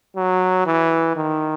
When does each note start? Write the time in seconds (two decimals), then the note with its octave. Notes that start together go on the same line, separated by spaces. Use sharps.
0.16 F#3
0.66 E3
1.16 D#3